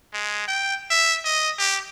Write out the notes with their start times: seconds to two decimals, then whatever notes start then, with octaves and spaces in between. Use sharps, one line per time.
0.13 G#3
0.48 G5
0.90 E5
1.25 D#5
1.59 G4